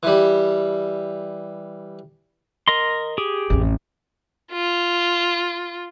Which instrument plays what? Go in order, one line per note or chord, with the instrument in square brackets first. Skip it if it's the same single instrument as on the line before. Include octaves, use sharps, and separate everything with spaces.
[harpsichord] E3 G3
[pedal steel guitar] A#4 D#5 C6
G4 G#4
[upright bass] A1 F2
[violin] F4